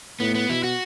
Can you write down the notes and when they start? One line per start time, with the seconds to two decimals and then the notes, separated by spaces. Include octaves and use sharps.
0.20 A2 B3
0.35 B3
0.49 B2 E4
0.64 F#4